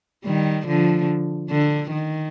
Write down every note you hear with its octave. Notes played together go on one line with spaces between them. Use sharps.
D#3 G3
D3 F3
D3
D#3